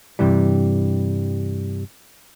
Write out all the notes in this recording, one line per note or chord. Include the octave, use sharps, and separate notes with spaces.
G2 C3 E3 G3